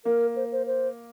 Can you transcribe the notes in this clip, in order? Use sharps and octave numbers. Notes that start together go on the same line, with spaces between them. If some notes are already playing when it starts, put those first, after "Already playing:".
A#3 A#4
C5
C5
C5